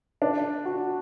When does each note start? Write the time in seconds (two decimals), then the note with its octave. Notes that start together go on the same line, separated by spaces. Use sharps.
0.22 D4
0.65 F#4